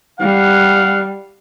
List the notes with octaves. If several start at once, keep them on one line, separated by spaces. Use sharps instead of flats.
G3 F5 F#5